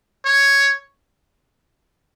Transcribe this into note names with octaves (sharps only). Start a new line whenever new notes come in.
C#5